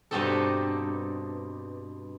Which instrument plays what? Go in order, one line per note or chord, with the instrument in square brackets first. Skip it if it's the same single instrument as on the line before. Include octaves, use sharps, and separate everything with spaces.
[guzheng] G2 B2 G3 C4 D#4 A4